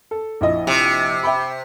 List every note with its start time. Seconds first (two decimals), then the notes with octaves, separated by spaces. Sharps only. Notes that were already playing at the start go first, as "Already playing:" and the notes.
0.11 A4
0.41 A#1 E4 D#5
0.67 C3
1.23 E5 G5 B5